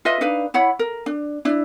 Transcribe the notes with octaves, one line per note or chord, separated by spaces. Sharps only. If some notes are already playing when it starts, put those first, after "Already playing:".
F4 B4 D#5 E5
D4 D#4 B4 F5
E4 C#5 F#5 B5
A#4
D4
D4 E4